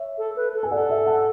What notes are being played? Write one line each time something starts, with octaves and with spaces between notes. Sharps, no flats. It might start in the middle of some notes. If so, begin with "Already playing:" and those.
Already playing: C#5 E5
A4
B4
A4
G#5
A4 D5 F#5
E5 G#5
F#5 A5